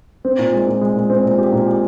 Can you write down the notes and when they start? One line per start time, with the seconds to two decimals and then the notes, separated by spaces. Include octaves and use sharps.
0.25 C4
0.38 A#2
0.53 G#3
0.67 A#2
0.81 G#3
0.95 A#2
1.10 C4
1.24 A#2
1.39 G4
1.52 A#2
1.67 G4